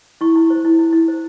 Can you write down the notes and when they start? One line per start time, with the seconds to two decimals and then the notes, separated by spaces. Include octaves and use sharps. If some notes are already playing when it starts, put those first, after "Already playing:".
0.21 E4 C#6
0.36 E4
0.50 C5
0.65 E4
0.79 E4
0.93 E4
1.08 C5